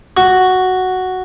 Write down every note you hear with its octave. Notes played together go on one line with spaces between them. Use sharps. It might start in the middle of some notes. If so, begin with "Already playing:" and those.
F#4